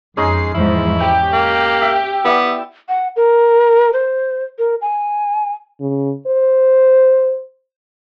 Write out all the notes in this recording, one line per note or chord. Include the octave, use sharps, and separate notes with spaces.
F2 G#3 C#4 D#4 C7
E2 G#2 F3 E4
G4 G5
A#3
E5
B3 E4 D5 E5
F#5
A#4
C5
A#4
G#5
C#3
C5